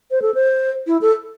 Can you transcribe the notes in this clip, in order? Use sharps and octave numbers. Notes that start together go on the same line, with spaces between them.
C5
A4
C5
E4
A4